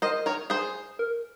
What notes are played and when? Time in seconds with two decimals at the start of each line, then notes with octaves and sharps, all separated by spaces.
0.02 A#4 C5 D#5
0.26 A#4 C#5
0.50 G#4 C5
0.99 A#4